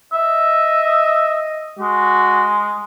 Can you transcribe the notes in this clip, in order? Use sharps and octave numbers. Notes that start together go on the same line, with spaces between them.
D#5 E5
G#3 F#4